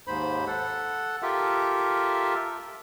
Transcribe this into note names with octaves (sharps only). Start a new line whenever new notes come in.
D#2 G#2 C5 B5
A4 F#5
F4 G4 A4 A#4 E5